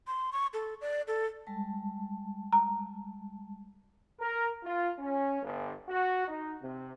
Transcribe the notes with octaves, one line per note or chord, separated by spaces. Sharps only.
C6
C#6
A4
D5
A4
G3 G#3 A5
A#5
A#4
F4
C#4
G1
F#4
D#4
C3